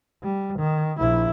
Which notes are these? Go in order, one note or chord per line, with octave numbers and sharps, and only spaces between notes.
G3
D#3
A#1 E4